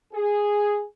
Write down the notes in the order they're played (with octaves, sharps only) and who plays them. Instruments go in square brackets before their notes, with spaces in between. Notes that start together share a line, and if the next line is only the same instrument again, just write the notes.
[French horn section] G#4